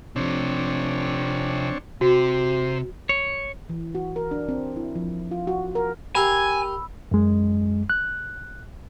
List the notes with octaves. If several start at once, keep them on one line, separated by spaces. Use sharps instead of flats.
C3 F3 C4 D4 C#5
C3 F#4 C5
C#5
E3
F#4
A#4
D4
C4
E4
F3
F4
F#4
A#4
G4 A#4 F5 G#5 B5 E6
F#2 G#3
F#6